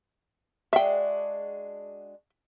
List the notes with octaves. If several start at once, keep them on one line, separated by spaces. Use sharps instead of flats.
G#3 D4 F#4 E5 G5